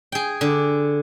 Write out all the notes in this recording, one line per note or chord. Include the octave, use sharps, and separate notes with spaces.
G#4 G5
D3